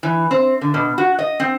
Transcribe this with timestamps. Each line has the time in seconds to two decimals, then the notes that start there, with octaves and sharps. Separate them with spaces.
0.03 E3
0.31 C4
0.61 D3
0.74 B2
0.98 F#4
1.19 D#5
1.40 C4